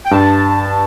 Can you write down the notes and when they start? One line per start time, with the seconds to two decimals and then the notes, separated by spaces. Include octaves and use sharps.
0.05 G5
0.11 G2 A5